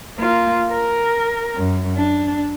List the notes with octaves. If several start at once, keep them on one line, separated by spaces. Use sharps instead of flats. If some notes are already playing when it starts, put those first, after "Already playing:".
A#3 F4
A#4
F#2
D4